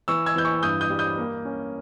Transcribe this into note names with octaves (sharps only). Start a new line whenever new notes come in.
E3 C#6 E6
E6 G#6
E3 G6
C#6 E6
G2 D#6 G6
D#6 G6
G3
D#6 G6
A#3
C#4